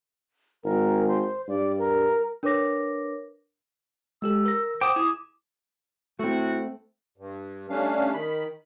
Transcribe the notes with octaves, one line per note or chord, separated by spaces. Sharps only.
G#1 A#4
C5
G2 D5
A#4
D4 A#4 B4 C#5 D6 A#6
G#3 G4 A4 E6
A#4 A#6
C5 F#5 G5 D6 D#6
E4 G#4 D#6
A2 A3 C4 E4 F#4
G2
G3 A3 C#4 D4 F5
D#3 B5